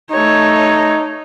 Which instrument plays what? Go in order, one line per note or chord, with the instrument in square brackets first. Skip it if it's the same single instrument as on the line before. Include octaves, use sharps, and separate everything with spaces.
[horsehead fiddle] A3 C#5 [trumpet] D#4